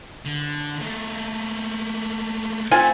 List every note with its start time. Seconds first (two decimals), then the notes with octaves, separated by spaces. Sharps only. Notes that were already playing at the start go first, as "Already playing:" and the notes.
0.26 D3
0.81 A3 A#3
2.71 A3 C4 F4 G#5